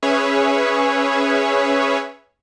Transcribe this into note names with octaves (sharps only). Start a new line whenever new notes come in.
C#4 G#4 B4 C#5 E5